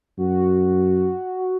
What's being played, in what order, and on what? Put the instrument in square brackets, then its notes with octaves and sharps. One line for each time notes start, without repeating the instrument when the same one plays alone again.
[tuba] F#2 [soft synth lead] F#4